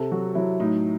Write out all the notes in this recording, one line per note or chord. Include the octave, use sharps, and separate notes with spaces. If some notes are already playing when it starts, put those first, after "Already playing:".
Already playing: C3 A4
F#3 F#4
F#3 E4
A2 D#4